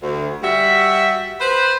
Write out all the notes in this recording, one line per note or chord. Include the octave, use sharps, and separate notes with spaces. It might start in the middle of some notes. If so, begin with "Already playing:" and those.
D2
G3 F#4 E5
B4 C5